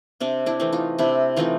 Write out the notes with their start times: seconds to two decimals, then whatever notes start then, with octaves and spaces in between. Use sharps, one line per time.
0.20 C3 C4 D4
0.46 D4 E4
0.60 E3 A3 C4
0.73 D#4 F4
0.98 C3 D4 E4
1.36 E3 A3 C4 D#4 F4